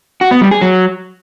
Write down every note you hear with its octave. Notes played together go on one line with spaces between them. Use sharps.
F#4
B3
G3
G#4
F#3